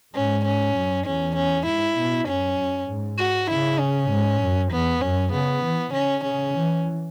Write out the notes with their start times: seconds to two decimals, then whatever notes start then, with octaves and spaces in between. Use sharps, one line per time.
0.14 G#2 C#4
0.45 C#4
0.75 F#2
1.06 E2 C#4
1.35 C#4
1.66 G#2 E4
1.97 B2
2.27 F#2 C#4
2.58 F#2
2.88 G#2
3.18 F#4
3.50 C#3 E4
3.79 C#4
4.10 G#2
4.41 F#2
4.71 E2 B3
5.01 F#2 C#4
5.32 C#3 B3
5.63 E3
5.93 C#3 C#4
6.24 C#3 C#4
6.55 E3